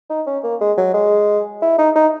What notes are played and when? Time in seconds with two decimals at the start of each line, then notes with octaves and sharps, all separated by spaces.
0.10 D#4
0.27 C#4
0.44 A#3
0.61 G#3
0.78 F#3
0.94 G#3
1.62 E4
1.78 D#4
1.95 D#4